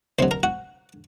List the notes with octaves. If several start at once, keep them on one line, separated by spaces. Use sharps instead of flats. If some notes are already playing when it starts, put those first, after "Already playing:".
D2 C3 F#3 C5 C6
A#4 A#5
F#4 F#5